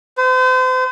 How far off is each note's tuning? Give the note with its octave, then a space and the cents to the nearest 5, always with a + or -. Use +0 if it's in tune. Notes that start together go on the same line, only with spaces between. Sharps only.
C5 -40